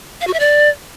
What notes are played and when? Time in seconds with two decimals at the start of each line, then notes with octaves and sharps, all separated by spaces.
0.21 F5
0.27 F#4
0.33 E5
0.40 D5